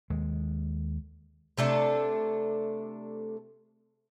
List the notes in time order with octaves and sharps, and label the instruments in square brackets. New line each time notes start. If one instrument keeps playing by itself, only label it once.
[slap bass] D#2 G#3
[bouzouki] C3 A3 D4 A4